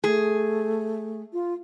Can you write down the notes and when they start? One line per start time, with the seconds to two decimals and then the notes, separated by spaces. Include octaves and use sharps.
0.04 A3 G#4
1.33 F4